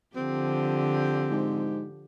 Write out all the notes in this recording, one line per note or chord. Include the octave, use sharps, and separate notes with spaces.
D3 F3 C4 G4
G#2